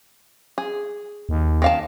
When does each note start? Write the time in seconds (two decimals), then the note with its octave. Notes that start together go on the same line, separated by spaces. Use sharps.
0.58 G#4
1.29 D#2
1.62 D#3 F5 A5